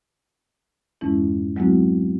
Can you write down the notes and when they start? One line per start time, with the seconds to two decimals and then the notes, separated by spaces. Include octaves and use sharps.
1.01 F2 G#2 E3 G#3 C#4 E4
1.56 F#3 G#3 B3 C4 E4 F#4